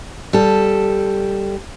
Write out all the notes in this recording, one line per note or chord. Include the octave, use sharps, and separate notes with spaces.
G3 A4